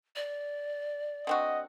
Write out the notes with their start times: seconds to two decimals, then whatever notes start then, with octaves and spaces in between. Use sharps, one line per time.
0.16 D5
1.27 D3 C4 F#4 D#5